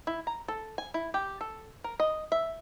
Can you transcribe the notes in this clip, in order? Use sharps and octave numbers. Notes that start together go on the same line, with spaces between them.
E4
A#5
A4
G#5
E4
G4
A4
A#4
D#5
E5